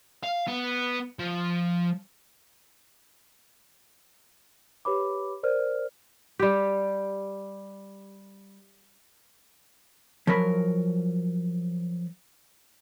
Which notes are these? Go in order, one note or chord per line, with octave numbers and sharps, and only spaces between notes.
F5
B3
F3
G4 B4 C#5 B5 D6
A#4 C5 D5 F6
G3 G4
F3 F#3 A#4 B5